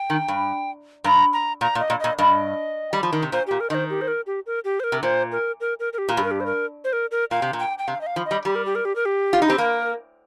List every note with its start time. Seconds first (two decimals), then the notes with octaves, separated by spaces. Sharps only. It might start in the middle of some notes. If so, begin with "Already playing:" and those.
Already playing: G5
0.10 D#3
0.28 G2
1.04 G2 A#5
1.33 A#5
1.61 A#2 A#5
1.75 A#2
1.80 D#5
1.90 A#2
2.00 A#2 D#5
2.18 G2 D#5
2.93 G3
3.03 F3
3.12 D#3
3.22 C3
3.32 A#2 C5
3.47 A#2 G4
3.60 A#4
3.70 D#3 C5 D#5
3.90 G4
4.01 C5
4.08 A#4
4.27 G4
4.46 A#4
4.65 G4
4.80 C5
4.84 A#4
4.92 C3
5.03 A#2 C5
5.32 A#4
5.61 A#4
5.80 A#4
5.93 A#4
5.98 G4
6.09 A#2
6.17 G2 G4
6.24 A#4
6.31 G4
6.40 C5
6.46 A#4
6.84 C5
6.93 A#4
7.11 A#4
7.31 A#2 F5
7.42 C3
7.53 A#2
7.59 G5
7.78 G5
7.88 C3 F5
8.01 D#5
8.07 F5
8.16 F3
8.26 D#5
8.31 G3
8.45 G3 G4
8.55 A#4
8.65 G4
8.75 A#4
8.85 G4
8.96 A#4
9.05 G4
9.33 F4
9.42 D#4
9.47 C4 G4
9.58 A#3 A#4